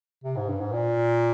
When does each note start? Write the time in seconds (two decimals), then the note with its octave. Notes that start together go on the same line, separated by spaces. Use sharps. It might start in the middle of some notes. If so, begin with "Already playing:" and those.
0.24 C3
0.37 G#2
0.49 G2
0.61 G#2
0.73 A#2